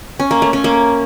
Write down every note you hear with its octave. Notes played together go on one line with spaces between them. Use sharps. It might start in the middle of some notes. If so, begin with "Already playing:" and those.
C#4
A#3
A3
C#4
A#3